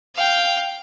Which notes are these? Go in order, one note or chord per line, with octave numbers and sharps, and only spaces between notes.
F5 G5